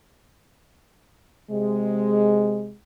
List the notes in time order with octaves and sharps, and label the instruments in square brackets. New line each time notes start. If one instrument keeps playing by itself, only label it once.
[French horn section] C3 G#3